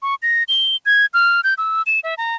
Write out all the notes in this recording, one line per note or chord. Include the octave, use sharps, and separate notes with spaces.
C#6
A#6
G7
G#6
F6
G6
E6
E7
E5
A#5